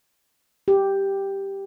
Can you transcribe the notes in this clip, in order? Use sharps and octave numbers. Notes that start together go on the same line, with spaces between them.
G4